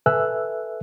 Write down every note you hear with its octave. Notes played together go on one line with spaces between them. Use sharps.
A4 B4 E5 G#5 E6 F#6